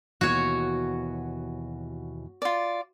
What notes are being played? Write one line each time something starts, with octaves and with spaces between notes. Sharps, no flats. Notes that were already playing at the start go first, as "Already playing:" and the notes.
D#2 B2 E3 F#4 C#5
F4 D5